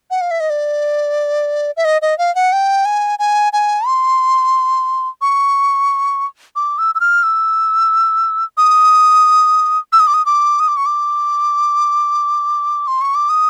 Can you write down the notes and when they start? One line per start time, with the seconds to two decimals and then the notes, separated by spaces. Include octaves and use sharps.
0.11 F#5
0.21 F5
0.31 E5
0.40 D#5
0.50 D5
1.77 E5
1.85 D#5
2.02 D#5
2.18 F5
2.35 F#5
2.53 G5
2.85 G#5
3.19 G#5
3.53 G#5
3.87 C6
5.21 C#6
6.56 D6
6.78 E6
6.95 E6
7.00 F6
7.23 E6
8.57 D#6
9.93 E6
10.00 D#6
10.07 D6
10.14 D#6
10.26 D6
10.60 D#6
10.68 D6
10.77 C#6
10.86 D6
12.87 C6
13.02 C#6
13.15 D6
13.29 D#6